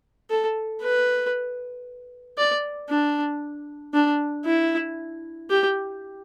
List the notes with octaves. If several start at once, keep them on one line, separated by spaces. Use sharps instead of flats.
A4
B4
D5
D4
D4
E4
G4